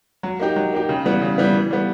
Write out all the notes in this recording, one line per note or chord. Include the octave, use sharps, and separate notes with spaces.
F#3
A#3 D#4 G4
F#3
A#3 D#4 G4
C#3
E3 G3 B3
C#3
E3 G3 B3
E3
G3 B3